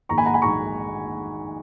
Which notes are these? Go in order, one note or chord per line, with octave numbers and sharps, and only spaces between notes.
A#1 G#2 D#3 G#3 A#5 C#6
G#5 B5
F#5 A#5
G#5 B5
A#1 G#2 D#3 G#3 A#5 C#6